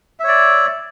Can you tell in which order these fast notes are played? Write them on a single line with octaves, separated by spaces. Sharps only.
E5 C#5 D5